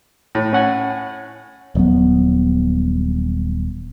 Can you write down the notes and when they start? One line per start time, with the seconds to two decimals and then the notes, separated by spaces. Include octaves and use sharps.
0.35 A2
0.53 C#4 F#5 G#5
1.75 D#1 F#3 B3